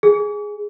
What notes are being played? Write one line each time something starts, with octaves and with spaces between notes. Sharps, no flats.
G#4